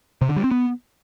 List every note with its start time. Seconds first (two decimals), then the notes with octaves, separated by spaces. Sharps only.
0.21 C3
0.29 D3
0.36 G3
0.44 C4
0.51 B3